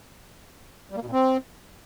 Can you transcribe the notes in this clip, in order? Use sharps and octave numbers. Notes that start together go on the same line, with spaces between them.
G3
A#3
B2
A#2
C4